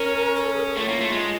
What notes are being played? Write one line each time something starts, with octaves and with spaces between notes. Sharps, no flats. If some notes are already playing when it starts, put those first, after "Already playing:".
Already playing: C#4 A#4
A#4
A4
G#4
A3 F4
A#3 E4
A3 F4
G#3